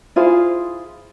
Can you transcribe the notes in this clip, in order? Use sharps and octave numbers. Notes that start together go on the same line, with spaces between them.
E4 F4 G#4 C5